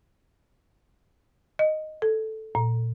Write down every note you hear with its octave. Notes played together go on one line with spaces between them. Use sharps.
D#5
A4
A#2